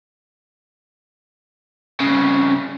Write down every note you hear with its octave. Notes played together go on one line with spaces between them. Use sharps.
C2 C#3